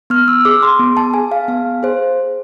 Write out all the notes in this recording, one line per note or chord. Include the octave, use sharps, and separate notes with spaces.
B3 F6
E6
G#4 D6
C6
B3
A5
G#4 G#5
F5
B3 F5
G#4 C5